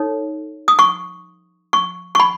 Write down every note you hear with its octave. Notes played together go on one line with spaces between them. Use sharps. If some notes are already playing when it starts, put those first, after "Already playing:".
Already playing: D#4 A4 C#5
D#6
C#6
C#6
C#6
B5